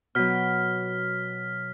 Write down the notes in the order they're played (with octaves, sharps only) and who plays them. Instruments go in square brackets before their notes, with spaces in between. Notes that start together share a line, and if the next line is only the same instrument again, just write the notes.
[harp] B2 F#3 [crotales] F6 B6